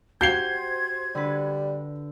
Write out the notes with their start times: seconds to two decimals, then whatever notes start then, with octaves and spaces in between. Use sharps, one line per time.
0.21 F#4 G4 C5 G5 G6 G#6 C7 G7
1.15 D3 G3 B4